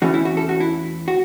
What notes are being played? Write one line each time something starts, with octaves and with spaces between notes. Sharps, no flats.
E2 E3 A3 C#4 F#4
E4
F#4
A4
F#4
E4
F#4